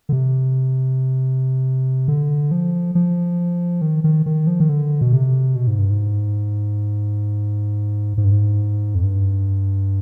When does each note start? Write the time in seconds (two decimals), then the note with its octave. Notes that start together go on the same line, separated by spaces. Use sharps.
0.09 D3
0.12 C3
2.08 D3
2.51 F3
2.95 F3
3.82 D#3
4.04 D#3
4.26 D#3
4.47 F3
4.60 D#3
4.69 D3
5.01 B2
5.13 C3
5.56 B2
5.67 G#2
5.79 G2
5.91 G#2
8.17 G#2
8.24 G2
8.32 G#2
8.95 F2
9.03 G2